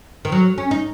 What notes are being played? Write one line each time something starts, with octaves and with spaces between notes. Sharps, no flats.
D#3
F#3
C#4
D#4